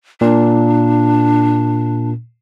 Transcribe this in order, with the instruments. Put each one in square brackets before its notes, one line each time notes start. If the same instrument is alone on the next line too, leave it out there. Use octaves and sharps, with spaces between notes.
[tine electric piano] A#2 [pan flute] D4